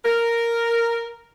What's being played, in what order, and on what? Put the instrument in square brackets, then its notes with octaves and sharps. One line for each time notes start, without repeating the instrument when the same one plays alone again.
[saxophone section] A#4